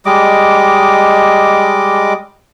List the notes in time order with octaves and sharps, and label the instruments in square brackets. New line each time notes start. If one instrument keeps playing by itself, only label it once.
[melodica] G3 G#3 D#5 D6